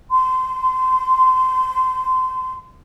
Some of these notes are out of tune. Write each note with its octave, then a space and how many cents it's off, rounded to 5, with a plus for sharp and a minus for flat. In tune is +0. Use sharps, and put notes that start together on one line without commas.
C6 -25